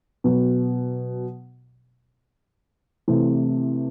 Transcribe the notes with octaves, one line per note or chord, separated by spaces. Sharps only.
B2 F#3 B3
C3 E3 A3 C4